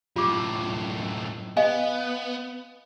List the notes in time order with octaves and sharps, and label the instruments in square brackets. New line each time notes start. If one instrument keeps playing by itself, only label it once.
[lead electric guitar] F#2 A2 [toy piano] F4 D6
[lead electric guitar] B3 [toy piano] D#5 F5 G#5